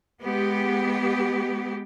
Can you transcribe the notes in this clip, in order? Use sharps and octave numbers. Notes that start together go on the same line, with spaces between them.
G#3 B3 G4